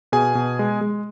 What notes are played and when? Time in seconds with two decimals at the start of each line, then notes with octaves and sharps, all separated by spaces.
0.12 B2 G#4 G#5
0.35 B2
0.59 G#3
0.81 G#3